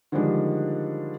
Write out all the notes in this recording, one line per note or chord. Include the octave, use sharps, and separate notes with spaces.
D3 D#3 F3 G3 G#3 D4